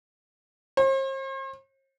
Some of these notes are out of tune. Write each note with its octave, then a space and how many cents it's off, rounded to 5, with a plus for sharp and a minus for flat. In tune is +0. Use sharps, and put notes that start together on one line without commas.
C5 +45